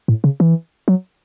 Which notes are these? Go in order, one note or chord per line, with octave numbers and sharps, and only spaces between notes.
A2
C#3
E3
F#3